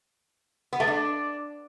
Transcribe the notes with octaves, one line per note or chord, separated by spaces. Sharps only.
B3
A3
D4